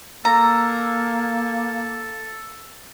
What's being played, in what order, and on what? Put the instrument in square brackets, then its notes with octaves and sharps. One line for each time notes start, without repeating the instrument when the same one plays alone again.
[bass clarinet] A#3 [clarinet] A4 [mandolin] A#5